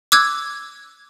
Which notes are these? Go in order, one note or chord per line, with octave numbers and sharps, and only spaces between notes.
D6 E6 F#6 G#6